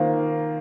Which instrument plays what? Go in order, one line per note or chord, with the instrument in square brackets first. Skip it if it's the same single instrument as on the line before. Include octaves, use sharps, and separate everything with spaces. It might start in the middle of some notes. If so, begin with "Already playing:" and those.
Already playing: [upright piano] D#3 A#3 F4 [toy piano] C5